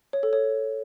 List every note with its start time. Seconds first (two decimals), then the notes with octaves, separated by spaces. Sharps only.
0.13 C#5
0.23 A4
0.33 C#5